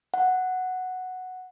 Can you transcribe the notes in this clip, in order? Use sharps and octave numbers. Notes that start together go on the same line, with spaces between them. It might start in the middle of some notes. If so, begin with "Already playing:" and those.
F#5